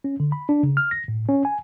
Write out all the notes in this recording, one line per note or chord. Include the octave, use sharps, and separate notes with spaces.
C#4
D3
B5
D4
C#3
F6
A#6
A2
C#4
G#5